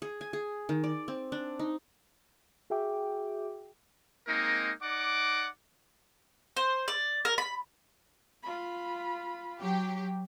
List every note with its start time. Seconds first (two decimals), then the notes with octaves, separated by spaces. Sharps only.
0.02 G#4
0.21 G#5
0.33 G#4
0.69 D#3
0.84 D5
1.08 C4
1.32 D4
1.59 D#4
2.70 F#4 G#4 E5 G5 D6
4.28 G#3 A#3 C4 D#4 A#4
4.82 D#4 D5 F#5 D6
6.56 C5
6.88 D5
7.25 A#4
7.38 B5
8.43 F4 B5
9.61 F#3 G4